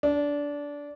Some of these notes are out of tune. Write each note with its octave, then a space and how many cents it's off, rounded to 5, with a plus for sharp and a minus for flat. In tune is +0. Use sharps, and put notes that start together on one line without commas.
D4 -20